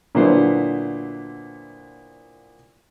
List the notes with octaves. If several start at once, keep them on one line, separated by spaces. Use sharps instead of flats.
A#2 D3 F#3 B3 E4 C5